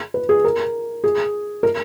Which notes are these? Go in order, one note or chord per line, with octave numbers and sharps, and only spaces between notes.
B4
G#4
A#4
G#4
A#4